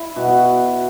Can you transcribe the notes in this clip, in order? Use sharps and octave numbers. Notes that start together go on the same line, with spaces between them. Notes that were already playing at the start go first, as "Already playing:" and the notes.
Already playing: E4
B2 F#4